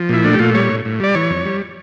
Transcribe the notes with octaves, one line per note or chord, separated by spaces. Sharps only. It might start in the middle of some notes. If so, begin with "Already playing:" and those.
Already playing: F3
A#2 E4
A3 D4
G4
A#2 F4
G3 C#5
A2
A2
G3 D5
E3 C#5
F2
G3